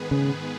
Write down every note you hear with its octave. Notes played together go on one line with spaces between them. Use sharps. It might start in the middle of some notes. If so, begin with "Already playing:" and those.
Already playing: G#2 D#3 B3 G#4 B4
C#3